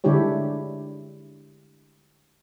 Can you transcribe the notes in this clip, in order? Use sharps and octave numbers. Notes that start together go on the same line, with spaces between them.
D3 G#3 D4 E4 G4 C#5